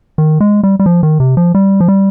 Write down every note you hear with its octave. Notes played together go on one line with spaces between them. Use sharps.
D#3
G#3
G3
G3
F3
D#3
C3
F3
G3
F3
G3